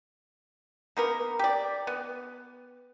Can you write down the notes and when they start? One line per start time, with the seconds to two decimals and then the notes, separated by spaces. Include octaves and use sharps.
0.97 A#3 B3 A#4
1.39 G4 D5
1.87 B3